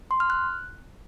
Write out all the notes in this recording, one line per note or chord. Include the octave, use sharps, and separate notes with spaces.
C6
F6
F#6